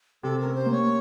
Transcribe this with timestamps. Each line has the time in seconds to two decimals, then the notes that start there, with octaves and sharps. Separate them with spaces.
0.23 C3 A4
0.39 A#4
0.45 C#4
0.55 C5
0.66 A#3
0.72 C#5